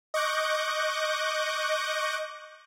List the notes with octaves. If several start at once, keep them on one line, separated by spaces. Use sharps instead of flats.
D#5 C#6 D6 F#6 G6 A#6